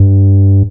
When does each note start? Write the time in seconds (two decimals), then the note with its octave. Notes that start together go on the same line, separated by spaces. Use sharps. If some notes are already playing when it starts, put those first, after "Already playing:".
Already playing: G2